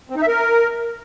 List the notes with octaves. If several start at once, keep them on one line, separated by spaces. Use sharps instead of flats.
C4
D#4
E5
A#4